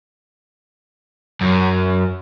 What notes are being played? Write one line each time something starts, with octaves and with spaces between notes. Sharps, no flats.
F#2